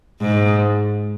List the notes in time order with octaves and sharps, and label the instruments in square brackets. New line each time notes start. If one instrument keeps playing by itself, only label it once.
[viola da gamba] G#2